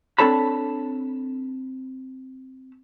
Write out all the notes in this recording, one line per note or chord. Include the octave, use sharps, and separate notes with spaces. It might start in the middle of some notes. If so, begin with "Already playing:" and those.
C4 D4 A4 C#5 A5 B5